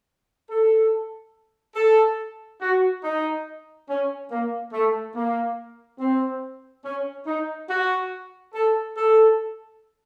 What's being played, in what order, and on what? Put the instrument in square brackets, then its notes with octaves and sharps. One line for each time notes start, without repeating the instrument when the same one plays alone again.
[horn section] A4
A4
F#4
D#4
C#4
A#3
A3
A#3
C4
C#4
D#4
F#4
A4
A4